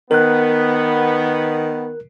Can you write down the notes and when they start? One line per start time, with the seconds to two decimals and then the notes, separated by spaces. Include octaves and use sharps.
0.11 D#3 B3 A#4 F#6